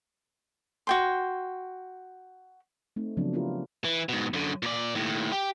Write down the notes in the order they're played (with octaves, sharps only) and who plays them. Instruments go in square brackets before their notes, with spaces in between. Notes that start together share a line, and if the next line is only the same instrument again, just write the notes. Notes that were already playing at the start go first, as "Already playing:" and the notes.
[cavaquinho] F#4 G5 C6
[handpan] A3 C4 D#4
C#3 F3 F#3 B3 C4 D4
B3 D4 E4 F4 G4 A#4
[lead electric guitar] E3
G#2 B2
F#2 D3
A#2 D5
D#2 A2
G4